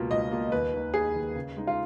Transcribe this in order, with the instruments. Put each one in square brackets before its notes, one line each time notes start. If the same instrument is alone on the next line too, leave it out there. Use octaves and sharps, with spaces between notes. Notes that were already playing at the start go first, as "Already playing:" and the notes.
Already playing: [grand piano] C#2 B2 A#3 F4
[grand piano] C#2 [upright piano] D#5
[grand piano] B2 A#3 F4
[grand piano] D#2 [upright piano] B4
[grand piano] D#3 A#3
[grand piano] D#2 [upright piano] G#4
[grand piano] D#3 A#3
C#3
G#3 D#4
[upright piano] F4